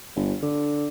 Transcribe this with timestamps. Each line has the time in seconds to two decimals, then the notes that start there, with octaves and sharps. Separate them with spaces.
0.16 G1
0.43 D3